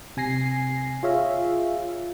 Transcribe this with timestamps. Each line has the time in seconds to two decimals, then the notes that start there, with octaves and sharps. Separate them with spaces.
0.17 C3 G#5 A#6 C7
1.03 F4 G#4 C#5 E5 F5